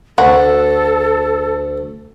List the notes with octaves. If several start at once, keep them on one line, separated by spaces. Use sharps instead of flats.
D2 F#4 A4